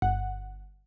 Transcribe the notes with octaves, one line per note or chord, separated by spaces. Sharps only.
G1 F#5